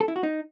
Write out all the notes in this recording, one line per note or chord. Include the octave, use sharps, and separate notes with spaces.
A4
E4
F#4
D#4